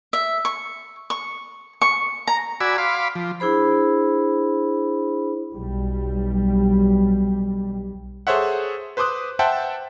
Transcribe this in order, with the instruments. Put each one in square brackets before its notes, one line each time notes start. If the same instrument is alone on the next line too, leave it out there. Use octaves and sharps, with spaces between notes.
[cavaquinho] E5
C#6
C#6
C#6
A#5
[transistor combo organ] F#4 D5 G#5 B5 E6
F5 B5 C6 D6
F3
[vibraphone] D4 E4 G#4 C5 B5
[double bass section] B1 G3
[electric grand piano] G#4 A4 C5 C#5 E5 F#5
B4 C5 C6 D6 D#6 F#6
C5 E5 F#5 G5 A5